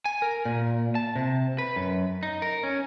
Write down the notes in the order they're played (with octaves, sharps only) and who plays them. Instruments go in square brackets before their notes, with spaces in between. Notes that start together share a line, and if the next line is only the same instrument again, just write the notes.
[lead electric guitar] G#5
A#4
A#2
A5
C3
B4
F#2
D#4
A#4
C#4